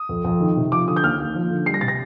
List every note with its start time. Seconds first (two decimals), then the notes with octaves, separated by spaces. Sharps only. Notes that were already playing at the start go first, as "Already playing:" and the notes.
Already playing: D#6
0.09 F2
0.24 F2
0.40 D#3
0.57 C3
0.72 F3 D6
0.88 D3 D#6
0.96 G6
1.03 D#2 F6
1.19 D#2
1.35 F3
1.50 D3
1.66 G3 C7
1.74 A#6
1.81 C3 A6
1.88 A#6